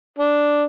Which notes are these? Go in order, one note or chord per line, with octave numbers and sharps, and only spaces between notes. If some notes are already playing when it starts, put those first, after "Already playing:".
D4